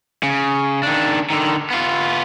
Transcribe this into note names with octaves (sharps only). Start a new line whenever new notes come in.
C#3
D#3 D4
D3 D#3
B3 F4